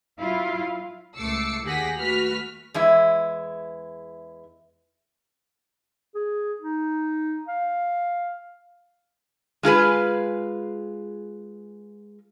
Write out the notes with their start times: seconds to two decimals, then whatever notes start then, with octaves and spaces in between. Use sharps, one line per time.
0.20 F#3 E4 F4 F5
1.17 C#2 A3 D6 E6 C7 C#7
1.63 D#2 G4 G#4 F#5 A#6 B6
1.98 A3 F#4 B4 F6 B6
2.74 E2 G#3 E4
6.15 G#4
6.62 D#4
7.48 F5
9.63 G#3 F4 G#4 B4